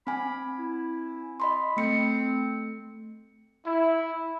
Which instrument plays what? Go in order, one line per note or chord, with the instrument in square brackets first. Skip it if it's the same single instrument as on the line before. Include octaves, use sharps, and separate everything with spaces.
[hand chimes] C4 G#5 [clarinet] B5
[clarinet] E4
[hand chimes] D#5 B5 C6
[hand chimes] A3 C#7 [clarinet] C4
[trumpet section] E4